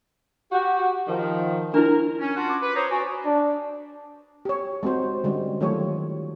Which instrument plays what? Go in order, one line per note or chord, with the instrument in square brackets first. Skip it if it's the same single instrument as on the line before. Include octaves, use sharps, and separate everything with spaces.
[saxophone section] F#4 G4
D#3 F3
[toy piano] D4 E4 [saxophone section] A#4
[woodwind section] C#4
D4 F4 F#4
[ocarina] D6
[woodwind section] B4
[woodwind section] C5 C#5 A#5 [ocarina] D#6
[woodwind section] F#4 D5 [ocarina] G#5
[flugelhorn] D4
[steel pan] G4 C#5
G#3 C4 F#4 C5
D3 G3 G#3 C#4 F#4
D#3 F#3 A3 F4 G4 C#5